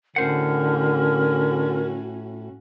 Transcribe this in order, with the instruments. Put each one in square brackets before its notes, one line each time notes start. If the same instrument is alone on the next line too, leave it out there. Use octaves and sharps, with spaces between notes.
[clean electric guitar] A2 C5 F#5 [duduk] D3 [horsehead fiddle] C#4 F#4 [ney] A#4